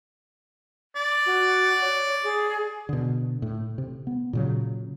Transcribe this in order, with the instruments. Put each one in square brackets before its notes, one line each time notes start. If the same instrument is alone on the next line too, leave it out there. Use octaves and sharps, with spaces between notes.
[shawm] D5
[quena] F#4
C#5
G#4
[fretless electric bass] B2 D3
A2
C3
B3
A#2 C#3 F#3